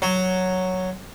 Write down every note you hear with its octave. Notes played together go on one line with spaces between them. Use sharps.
F#3